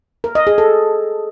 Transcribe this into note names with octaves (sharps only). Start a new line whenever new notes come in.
A#4
D#5
G#4
A4